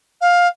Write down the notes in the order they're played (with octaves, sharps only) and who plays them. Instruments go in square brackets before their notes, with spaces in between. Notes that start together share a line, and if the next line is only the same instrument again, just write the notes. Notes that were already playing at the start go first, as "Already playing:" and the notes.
[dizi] F5